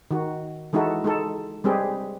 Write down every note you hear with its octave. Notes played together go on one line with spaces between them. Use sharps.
D#3 F#4
E3 G#3 D#4 E4 F#4 A4
G#3 D#4 A4
G3 G#3 C4 G4 G#4 B4